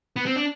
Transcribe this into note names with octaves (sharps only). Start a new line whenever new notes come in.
B3
C4
D4